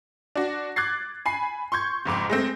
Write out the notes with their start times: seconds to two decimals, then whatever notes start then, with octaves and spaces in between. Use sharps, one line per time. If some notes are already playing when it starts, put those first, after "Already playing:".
0.36 D4 F#4
0.76 D6 F#6 G#6 A6 C7
1.26 G#5 B5 C7
1.72 C6 C#6 G6 G#6
2.05 F#1 F2 G#2 D6
2.30 G#3 A3 C4